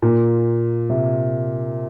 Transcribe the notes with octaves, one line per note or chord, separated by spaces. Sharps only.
A#2
C3